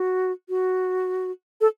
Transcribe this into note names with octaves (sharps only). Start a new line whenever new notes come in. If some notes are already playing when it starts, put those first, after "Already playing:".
Already playing: F#4
F#4
A4